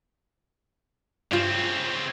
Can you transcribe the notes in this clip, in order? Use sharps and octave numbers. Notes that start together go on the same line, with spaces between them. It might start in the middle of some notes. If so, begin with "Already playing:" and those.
G2 C#3 C4 F4